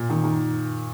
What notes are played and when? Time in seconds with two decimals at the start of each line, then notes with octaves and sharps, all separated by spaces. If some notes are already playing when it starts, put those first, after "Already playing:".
Already playing: A#2
0.09 D#3
0.24 D#3